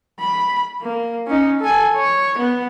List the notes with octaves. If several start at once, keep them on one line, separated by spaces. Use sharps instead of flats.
B5
A#3
C#4 D#4
A4 G#5
C#5
B3